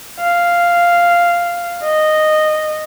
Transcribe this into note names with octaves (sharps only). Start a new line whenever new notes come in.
F5
D#5